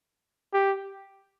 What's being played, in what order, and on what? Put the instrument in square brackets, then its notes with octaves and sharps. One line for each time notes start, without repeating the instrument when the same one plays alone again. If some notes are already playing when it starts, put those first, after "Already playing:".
[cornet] G4